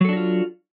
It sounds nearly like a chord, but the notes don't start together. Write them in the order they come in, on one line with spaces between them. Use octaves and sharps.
F#3 A4 D4 F#4 F4